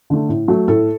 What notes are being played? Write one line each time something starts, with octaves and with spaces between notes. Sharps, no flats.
D3 A3
A2
F#3 A3
A2 A4